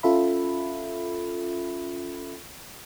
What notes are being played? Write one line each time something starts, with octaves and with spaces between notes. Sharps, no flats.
C#4 F4 A4 E5 B5